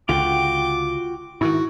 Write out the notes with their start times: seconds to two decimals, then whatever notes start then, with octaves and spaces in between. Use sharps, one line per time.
0.09 C#2 D3 F4 F#4 G5 D6
1.41 G#2 D#3 E4 F#4